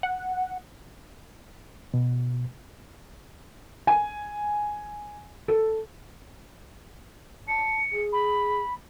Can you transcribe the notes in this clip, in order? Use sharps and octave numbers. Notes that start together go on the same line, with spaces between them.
F#5
B2
G#5
A4
A5 C#7
G#4
B5